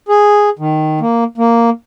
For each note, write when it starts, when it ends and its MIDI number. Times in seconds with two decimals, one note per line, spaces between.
0.09 0.50 68
0.59 1.00 51
1.01 1.24 58
1.38 1.70 58